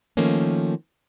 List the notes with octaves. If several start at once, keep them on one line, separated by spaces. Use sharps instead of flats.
D#3 F3 A3 A#3 C#4